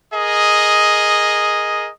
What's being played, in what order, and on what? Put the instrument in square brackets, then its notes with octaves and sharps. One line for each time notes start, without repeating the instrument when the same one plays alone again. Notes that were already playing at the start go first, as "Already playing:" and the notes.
[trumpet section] G#4 A#4 D#5